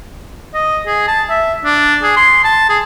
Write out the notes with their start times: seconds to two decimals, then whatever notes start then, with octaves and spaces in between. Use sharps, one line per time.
0.54 D#5
0.86 G#4
1.08 A5
1.29 E5
1.64 D4
2.03 G#4
2.16 C6
2.44 A5
2.70 G#4